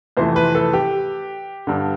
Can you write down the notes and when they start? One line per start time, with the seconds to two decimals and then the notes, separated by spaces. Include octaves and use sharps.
0.17 F2 C3 E3 A3 C5
0.36 B4
0.55 A4
0.73 G4
1.67 G2 D3